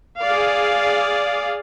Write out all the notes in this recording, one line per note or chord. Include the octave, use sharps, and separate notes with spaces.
G#4 D5 F5